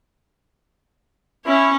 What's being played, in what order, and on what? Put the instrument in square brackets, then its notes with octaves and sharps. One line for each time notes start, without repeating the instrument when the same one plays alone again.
[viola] C#4 C#5 [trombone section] E4